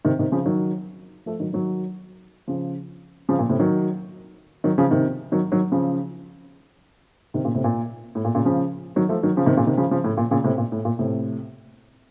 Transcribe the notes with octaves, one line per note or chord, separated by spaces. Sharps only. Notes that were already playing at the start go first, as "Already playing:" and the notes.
C3 D#3
C3 D#3
C#3 F3
D#3 F#3
F3 A3
D#3 F#3
D#3 F#3
C#3 F3
C#3 F3
A#2
A2 C3
D#3 F#3
D#3 F#3
C#3 F3
C3 D#3
D#3 F#3
D#3 F#3
C#3 F3
C3 D#3
A#2 C#3
A2 C3
A#2
A2
A#2
A#2 C#3
C#3 F3
D#3 F#3
F3 A3
D#3 F#3
C#3 F3
C3 D#3
A#2 C#3
C3 D#3
C#3 F3
C#3 F3
A2
A#2
A#2 C#3
A2 C3
A#2
A2
A#2
A2 C3